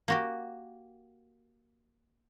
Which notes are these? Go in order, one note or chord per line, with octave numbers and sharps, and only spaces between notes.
A#3 F#4 G4